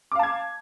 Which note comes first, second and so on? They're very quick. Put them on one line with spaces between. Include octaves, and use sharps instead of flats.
D6 F5 A5 G#6